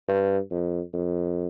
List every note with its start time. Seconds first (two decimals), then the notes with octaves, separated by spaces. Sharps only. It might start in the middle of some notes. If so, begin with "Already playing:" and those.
0.08 G2
0.51 F2
0.94 F2